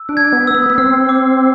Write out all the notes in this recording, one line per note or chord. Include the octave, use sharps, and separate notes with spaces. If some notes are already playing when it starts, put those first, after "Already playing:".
Already playing: E6
D4
G#6
B3
E6
B3
B3
C4 F6
D6